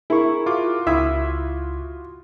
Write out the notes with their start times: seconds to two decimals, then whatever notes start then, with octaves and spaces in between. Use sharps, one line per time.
0.10 E4 G#4 A#4 C#6
0.46 F4 F#4 D6
0.87 C#2 E4 E5 D#6 G#6